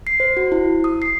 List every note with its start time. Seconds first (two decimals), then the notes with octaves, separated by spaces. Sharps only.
0.07 C7
0.20 C5
0.37 F#4
0.52 E4
0.84 D#6
1.02 C7